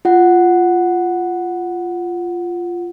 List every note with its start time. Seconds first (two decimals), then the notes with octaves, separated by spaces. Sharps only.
0.05 F4 F#5